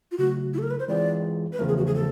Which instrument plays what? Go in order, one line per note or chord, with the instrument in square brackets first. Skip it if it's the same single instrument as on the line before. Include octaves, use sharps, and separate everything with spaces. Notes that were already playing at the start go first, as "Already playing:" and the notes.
[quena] F4
[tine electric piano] C#3 F#3 A3 [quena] F#4
[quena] E4
A4
A#4
B4
C5
[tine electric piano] E3 G#3 C4 F4 G#4 [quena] D5
[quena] B4
[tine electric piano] E2 C#3 F3 A3 [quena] A#4
[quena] G#4
F#4
G#4
A4